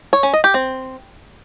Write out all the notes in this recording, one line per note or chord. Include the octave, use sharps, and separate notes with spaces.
C#5
C#4
D#5
G4
C4